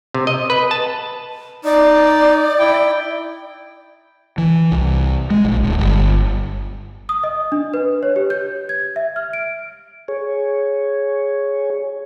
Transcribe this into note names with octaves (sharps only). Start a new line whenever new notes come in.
C3
D#5
B4
A5
D#4 D5
E4 G5
E3
C2
G#3
A#1
D1
G1
D#6
D#5
D4
B4
C#5
G4
G6
G#6
E5
F6
D7
G#4 C#5